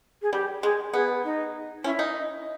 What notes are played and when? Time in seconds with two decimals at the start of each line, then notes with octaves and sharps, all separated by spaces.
0.22 G#4
0.33 G3 G4
0.63 G#3 G#4
0.93 B3 G#4
1.24 D#4
1.84 C#4 E4
1.99 D#4